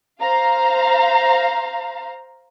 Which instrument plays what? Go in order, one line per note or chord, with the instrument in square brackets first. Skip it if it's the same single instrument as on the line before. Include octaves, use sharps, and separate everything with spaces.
[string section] C5 F5 A#5